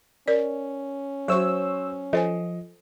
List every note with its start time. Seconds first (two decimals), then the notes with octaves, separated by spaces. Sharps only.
0.28 C#4 A#4 D5
1.28 F#3 F#4 C5 C#5 C#6 E6
2.13 F3 A4 C5 D#5 G#5